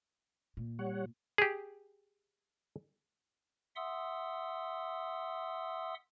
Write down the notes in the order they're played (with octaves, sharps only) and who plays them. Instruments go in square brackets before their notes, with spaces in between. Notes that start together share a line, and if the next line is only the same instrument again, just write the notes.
[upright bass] A#2
[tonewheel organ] G3 C#5 F#5
[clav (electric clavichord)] G4 G#4
[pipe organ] E5 F#5 C6 D#6 E6